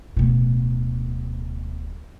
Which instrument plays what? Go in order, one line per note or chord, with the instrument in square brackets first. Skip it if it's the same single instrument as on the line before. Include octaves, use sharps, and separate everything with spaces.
[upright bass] D1 B2